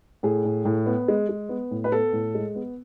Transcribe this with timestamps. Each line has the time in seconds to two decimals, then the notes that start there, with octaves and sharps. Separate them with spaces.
0.23 A2 G#4
0.45 A2
0.65 A2
0.86 B3
1.08 G#3
1.29 G#3
1.49 B3
1.71 A2
1.84 B4
1.92 B3 A4
2.13 A2
2.34 G#3
2.55 B3